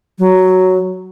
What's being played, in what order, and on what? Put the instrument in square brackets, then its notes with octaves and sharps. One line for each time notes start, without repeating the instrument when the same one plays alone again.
[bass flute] F#3